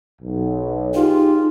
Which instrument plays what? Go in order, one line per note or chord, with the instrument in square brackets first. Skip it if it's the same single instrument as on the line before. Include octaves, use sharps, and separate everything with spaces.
[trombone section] B1
[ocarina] D#4 [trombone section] F4 G4 G#4